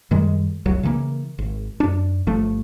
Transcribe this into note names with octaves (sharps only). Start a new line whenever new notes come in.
F#2 D#3 G3 G#3
F1 C2 F#3
C#3 E3 G#3 A#3
G#1
F#2 D4
G1 F3 A3